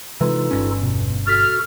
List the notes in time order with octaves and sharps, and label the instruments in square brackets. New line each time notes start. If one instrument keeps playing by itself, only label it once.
[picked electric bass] C3 E3 G#3 [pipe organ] D#4 F4 A4 [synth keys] B4
[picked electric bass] G1 G2 C#4
[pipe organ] E2 [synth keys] B2
[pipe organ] F#4 A4 [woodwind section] F6 [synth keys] A6 B6